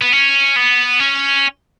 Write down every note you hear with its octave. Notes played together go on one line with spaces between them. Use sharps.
B3
C#4
B3
C#4